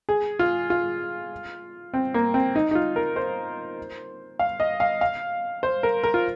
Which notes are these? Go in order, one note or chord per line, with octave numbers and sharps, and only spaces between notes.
G#4
F4
F4
C4
A#3
C4
D#4
D#4
F4
A#4
C5
F5
D#5
F5
F5
C5
A#4
A#4
F4